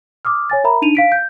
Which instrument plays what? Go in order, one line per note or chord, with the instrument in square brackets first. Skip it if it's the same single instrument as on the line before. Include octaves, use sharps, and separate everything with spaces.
[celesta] D6 D#6 F6
C#5 G#5 A6
A#4 E5 A#5 B5
D4 D#4 D#7 F7
F5 B6 D7
G6